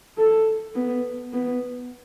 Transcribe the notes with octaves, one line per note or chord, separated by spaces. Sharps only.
A4
B3
B3